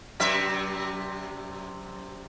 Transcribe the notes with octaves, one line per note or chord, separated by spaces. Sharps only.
F#2 C3 E5